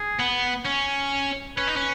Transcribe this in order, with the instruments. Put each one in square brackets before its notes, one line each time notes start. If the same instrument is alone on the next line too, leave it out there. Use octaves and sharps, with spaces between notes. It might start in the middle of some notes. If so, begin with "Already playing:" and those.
Already playing: [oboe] G#4
[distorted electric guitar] B3
C#4
[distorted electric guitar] C#4 [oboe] B4
[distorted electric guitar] D#4
C#4